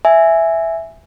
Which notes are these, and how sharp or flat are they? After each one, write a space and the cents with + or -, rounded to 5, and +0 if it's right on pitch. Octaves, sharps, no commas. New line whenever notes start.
E5 +0 G#5 +0